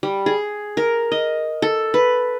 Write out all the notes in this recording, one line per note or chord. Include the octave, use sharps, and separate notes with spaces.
G3
G#4
A#4
D#5
A4
B4